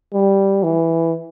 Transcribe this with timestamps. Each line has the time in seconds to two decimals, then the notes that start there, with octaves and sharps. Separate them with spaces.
0.13 G3
0.63 E3